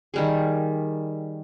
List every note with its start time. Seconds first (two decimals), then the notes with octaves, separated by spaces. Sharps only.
0.14 D#3 G3 G#4